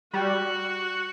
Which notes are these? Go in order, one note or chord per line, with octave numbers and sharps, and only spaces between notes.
G3 F#4